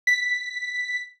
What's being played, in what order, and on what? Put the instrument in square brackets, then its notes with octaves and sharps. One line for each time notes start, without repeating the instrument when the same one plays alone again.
[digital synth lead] B6